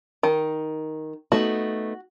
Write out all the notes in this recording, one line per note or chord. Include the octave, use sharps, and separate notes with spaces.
D#3
A3 B3 D#4 F#4